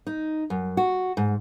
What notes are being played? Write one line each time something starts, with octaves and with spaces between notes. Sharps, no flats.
D#4
F#2
F#4
G#2